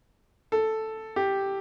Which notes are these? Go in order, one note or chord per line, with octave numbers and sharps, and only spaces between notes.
A4
G4